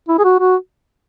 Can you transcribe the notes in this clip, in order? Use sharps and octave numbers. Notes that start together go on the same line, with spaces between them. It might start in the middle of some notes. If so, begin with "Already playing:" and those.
E4
G#4
F#4
F#4